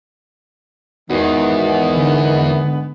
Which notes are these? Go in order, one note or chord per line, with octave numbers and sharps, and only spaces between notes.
E2 G#2 D#3 B3 F#4
D3